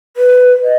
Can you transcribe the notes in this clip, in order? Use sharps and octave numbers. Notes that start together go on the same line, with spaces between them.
B4
D#5